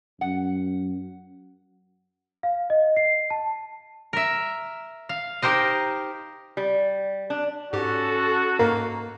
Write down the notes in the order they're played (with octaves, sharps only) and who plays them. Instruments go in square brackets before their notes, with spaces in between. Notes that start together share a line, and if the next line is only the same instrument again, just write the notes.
[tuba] F#2 [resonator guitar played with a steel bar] F#5
[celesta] F5
D#5
C7
A5
[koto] A#4 E5
F5
D#4 G4 A#4 C5 D#5
[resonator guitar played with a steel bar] G3
D4
[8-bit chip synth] G#2 G4 [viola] C#4 A4 [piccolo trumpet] F#4
[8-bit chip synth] G#2 A#3 F5 [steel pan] A#4